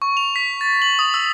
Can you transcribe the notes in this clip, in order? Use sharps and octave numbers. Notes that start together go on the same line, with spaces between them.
C#6
F7
B6
A6
F#7
D#6
E6